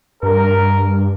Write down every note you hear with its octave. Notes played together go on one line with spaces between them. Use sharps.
G2 A#4